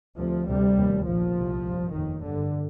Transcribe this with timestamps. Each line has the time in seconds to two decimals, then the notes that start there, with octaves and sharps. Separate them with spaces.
0.18 D2 C3 F3
0.48 D2 C3 G3
0.78 F1 D#2
1.05 A#1 A#2 F3
1.35 C2 C3
1.64 G#1 G2
1.93 F1 D#2 D#3
2.22 G1 G2 D3